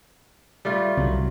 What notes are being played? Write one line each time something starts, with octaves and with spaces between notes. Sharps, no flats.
G3 A3 F4
C2 F#3